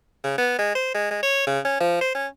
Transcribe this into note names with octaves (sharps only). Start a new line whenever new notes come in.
C#3
B3
G#3
C5
G#3
G#3
C#5
C#3
C#4
F3
C5
C#4